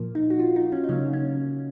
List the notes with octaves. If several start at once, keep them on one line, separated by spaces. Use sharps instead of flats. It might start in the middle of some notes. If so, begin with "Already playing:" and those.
Already playing: A#2 F3 A#3
D#4
F#4
F4
D#4
C#4
D#4
C#3 F#3 A#3 C#4
C#4